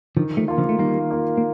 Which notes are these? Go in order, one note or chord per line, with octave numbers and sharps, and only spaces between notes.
D3 D#3 F3
F3 A3
A#3 F4
D3 F3
A3
D#3 G3 A#3
A#3 F4
A#3